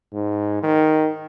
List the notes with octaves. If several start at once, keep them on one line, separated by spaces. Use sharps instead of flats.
G#2
D#3